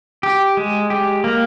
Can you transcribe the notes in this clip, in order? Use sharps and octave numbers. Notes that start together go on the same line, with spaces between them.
G4
G#3
G4
A#3